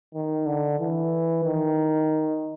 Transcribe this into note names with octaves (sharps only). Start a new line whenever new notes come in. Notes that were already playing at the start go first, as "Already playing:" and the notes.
D#3
D3
E3
D#3